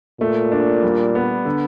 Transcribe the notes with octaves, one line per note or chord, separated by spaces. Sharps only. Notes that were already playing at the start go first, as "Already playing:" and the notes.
A#2 A3
D4
G3
B3
D3